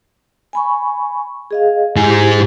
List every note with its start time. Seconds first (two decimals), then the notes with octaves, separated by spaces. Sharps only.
0.53 G#5 B5 C#6
1.51 G#4 D#5 F5
1.96 G#2 E4 G4 G#4